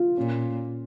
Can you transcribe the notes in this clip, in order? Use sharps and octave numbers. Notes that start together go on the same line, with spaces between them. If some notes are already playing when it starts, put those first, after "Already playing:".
Already playing: F4
A#2 C#4